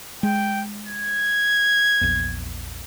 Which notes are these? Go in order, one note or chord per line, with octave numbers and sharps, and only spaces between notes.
G#3 G5
G#6
A#1 E2